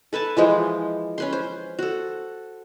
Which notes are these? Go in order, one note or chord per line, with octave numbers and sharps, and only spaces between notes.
A4 B4 G#5 A5
E3 F3 G#3 C5
C#4 B4 C6
C5
F#4 A4